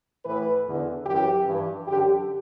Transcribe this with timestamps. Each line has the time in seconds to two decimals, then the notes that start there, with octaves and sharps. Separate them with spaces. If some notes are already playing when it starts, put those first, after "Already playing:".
0.24 A2 E3 B4
0.65 E2 D3
1.06 F#2 E3 G4
1.46 G2 E3
1.87 F#2 D3 G4